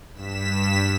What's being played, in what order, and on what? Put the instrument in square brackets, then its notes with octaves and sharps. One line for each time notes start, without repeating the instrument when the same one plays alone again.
[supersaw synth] G2 B6 E7